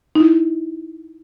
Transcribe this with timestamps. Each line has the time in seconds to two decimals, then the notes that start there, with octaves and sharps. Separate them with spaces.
0.15 D#4
0.20 E4